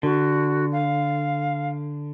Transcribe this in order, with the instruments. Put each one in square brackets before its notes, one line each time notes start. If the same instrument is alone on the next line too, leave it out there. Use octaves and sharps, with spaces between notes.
[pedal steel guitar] D3 [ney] F#4
[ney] F5